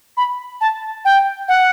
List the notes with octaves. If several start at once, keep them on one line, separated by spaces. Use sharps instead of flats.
B5
A5
G5
F#5